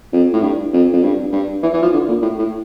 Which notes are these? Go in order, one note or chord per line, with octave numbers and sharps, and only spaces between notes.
F2
A2
G2
F2
F2
G2
G2
E3
E3
F3
D3
A#2
A2
A2